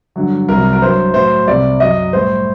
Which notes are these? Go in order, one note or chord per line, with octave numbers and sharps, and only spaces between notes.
G2 D3 F#3
C2 C3 F#3 A#4
A#4
G2 F#3 C5
A2 F#3 C5
C2 C3 G3 D5
F#2 F#3 D#5
A2 G3 C5